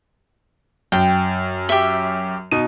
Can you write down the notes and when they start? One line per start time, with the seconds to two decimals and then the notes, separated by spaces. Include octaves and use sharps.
0.92 F#2 G5
1.69 G4 E5
2.51 B2 D#4 D#7